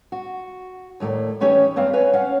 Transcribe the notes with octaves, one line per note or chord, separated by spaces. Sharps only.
F#4
D#2 A2 A3 A#3 D5
E3 A3 C#4 D#4 G4 C#5
G2 A#3 C4 F5 G5
B4 C#5 G#5
C#4 F5 F#5